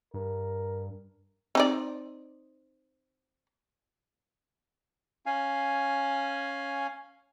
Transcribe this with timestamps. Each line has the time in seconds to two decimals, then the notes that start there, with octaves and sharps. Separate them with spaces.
0.14 G2 A#4
1.55 C4 D#4 D5
5.26 C#4 F5 G#5